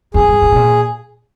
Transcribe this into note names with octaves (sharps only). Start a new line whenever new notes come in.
F2 G#4
G2
G#2
C3
A#2